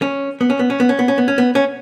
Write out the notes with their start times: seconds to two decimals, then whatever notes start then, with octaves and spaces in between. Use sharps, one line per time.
0.02 C#4
0.41 B3
0.50 C#4
0.59 B3
0.70 C#4
0.80 B3
0.89 C#4
0.99 B3
1.08 C#4
1.18 B3
1.28 C#4
1.38 B3
1.55 C#4